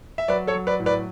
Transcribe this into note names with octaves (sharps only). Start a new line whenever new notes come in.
E5
F#3 B4 D5
A4 C#5
F#3
B4 D5
A2
B4 D5